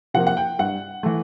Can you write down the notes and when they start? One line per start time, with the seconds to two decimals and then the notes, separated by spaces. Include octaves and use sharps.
0.14 C3 F3 A#3 F#5
0.27 F#5
0.37 G5
0.59 G2 F#5
1.03 E3 A3